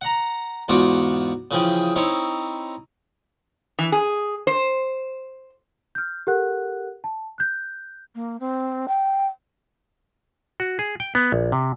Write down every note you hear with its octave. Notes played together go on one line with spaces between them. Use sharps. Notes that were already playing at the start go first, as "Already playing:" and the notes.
F#5 A#5
E2 G#2 F4 F#4 F#5 D6
C#3 E3 F3 G#4 G5
C4 D#4 E4 C#5
E3
G#4
C5
F6 G6
G4 A4 A#4 F#5 F#6
A5
F#6 G6
A#3
C4
G5
F#4
G#4
G5
B3
A#1
C3